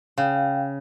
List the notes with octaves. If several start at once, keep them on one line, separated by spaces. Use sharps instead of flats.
C#3 F5 G5